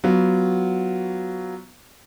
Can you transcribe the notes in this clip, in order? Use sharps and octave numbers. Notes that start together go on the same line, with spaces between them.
F#3 B3 F4